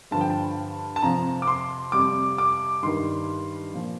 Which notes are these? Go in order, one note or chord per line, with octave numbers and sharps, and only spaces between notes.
G2 D3 F3 A5
G5
A5
A5
F2 C3 F3 A#5
D6
C6
F2 C3 G3 D6
D6
G2 D#3 G3 C6
A#2 F3